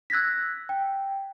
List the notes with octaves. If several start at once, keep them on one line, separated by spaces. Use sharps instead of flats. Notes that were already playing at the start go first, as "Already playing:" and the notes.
E6 F#6 G#6 A#6 B6
G5